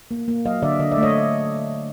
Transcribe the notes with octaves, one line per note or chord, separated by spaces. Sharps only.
A#3
A#3
F#3 D#5 F5
D3 D5 E5
D3 D#5
D5 E5
A3
C#5 D#5